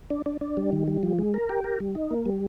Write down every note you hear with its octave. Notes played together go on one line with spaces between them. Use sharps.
D4
D4
D4
G3
D#3
G3
F3
G#3
A#4
G4
A#4
G3
D#4
A#3
G3